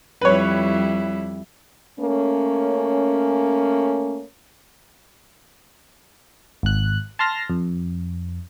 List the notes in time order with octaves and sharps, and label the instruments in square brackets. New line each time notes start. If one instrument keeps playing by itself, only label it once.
[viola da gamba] F2 G3 E4 [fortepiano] B4 C#5
[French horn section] A3 A#3 C#4
[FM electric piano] G#1 F#6
A5 C6 F6 A#6
F2